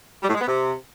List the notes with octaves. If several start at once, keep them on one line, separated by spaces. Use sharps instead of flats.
G3
A2
G#3
B3
C3